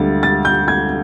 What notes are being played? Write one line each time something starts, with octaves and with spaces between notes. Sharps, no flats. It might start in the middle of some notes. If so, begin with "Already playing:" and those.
Already playing: D2 D3 G3 A6
A6
G6
G#6